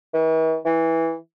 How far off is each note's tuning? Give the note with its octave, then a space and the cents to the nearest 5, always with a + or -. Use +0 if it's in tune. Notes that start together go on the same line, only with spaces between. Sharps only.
E3 -45
E3 -10